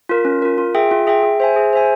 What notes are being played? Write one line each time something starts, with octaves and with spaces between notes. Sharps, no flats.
F4 A#4
C#4
F4 A#4
F4
G#4 E5 G5
F4
G#4 E5 G5
G#4
C5 E5 G#5
G#4
C5 E5 G#5